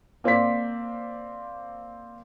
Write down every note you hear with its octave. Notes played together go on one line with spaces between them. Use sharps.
A#3 C4 C5 D5 B6